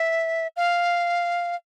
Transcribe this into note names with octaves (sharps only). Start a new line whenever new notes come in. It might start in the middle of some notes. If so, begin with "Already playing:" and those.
Already playing: E5
F5